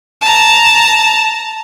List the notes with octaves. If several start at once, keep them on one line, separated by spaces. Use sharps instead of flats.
A5 A#5